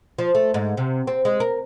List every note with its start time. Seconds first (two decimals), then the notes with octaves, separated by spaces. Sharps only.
0.18 F3
0.35 A3
0.54 G#2
0.77 C3
1.07 C4
1.25 G#3
1.40 A#4